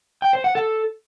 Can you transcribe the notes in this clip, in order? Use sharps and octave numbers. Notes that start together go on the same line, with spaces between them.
G5
C5
F#5
A4